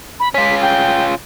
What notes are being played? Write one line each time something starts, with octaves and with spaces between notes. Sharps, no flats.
B5
C#4 F4 B6
G5